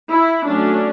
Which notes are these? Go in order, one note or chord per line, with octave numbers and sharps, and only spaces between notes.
E4
F#3 A3 C#4 D4